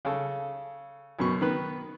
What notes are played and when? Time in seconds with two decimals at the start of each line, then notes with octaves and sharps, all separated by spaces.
0.05 C#3 A4
1.19 F#2 B2 C#6
1.41 D#3 B3 B4